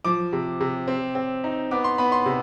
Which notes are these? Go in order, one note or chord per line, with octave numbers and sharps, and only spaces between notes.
F3 D6
C3
C3
C4
C4
D#4
B3 D6
C6
B3 B5
C6
C3